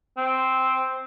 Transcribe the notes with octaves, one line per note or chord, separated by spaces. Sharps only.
C4